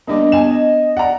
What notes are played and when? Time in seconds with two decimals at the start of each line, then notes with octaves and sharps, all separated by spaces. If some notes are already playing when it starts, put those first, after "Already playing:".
0.07 G3 A#3 B3 D4 D#5 D6
0.32 B3 G#5 E7
0.97 D5 F#5 A#5